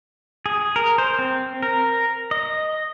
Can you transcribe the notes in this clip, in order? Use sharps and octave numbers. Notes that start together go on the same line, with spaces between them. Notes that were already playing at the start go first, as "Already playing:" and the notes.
G#4
A#4
C5
C4
A#4
D#5